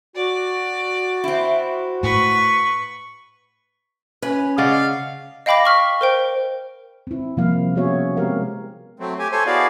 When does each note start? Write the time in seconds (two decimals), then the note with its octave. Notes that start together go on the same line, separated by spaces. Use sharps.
0.16 F#4 D5
1.24 C4 E4
2.03 A2 B4 C#6
4.22 C#4 B4
4.58 C#3 D5 D#5 F5 F#5
5.46 D#5 F5 G5 B5 D6 A#6
5.65 C#6 F6 B6
6.01 A#4 C5 G5
7.07 C4 E4
7.37 C3 F3 G3 A#3 E4 F5
7.75 B3 C#4 F#4 G#4 C#5 E5
8.17 G#3 B3 C4 G4 A#4 F5
9.00 F#3 A3 C4
9.19 A3 G4 G#5
9.32 A4 C5 C#5 G#5
9.46 B3 E4 F#4 G#4 D5 F5